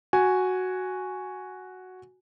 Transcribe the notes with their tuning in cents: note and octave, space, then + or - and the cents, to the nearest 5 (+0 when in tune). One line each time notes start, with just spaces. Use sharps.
F#4 +0 G#5 +0